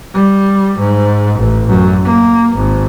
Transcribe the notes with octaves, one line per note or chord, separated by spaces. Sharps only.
G3
G#2
A1
F#2
A#3
G#1